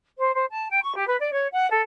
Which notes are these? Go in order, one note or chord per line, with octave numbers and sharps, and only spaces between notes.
C5
C5
A5
G5
C#6
G4
B4
D5
C#5
F#5
A4